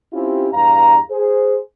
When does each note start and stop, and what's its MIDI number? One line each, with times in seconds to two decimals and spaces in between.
0.13 0.48 60
0.13 0.48 61
0.13 0.48 64
0.13 0.48 65
0.13 0.48 67
0.53 0.98 40
0.53 0.98 43
0.53 0.98 77
0.53 0.98 82
1.10 1.58 68
1.10 1.58 72